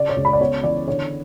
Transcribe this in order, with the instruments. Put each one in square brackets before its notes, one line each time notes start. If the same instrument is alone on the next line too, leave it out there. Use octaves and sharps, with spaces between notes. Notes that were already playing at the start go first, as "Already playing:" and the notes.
Already playing: [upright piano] C#3 D5
C#5
C#2
B5
D5
B3 C#5
E3 D5
D3 C#5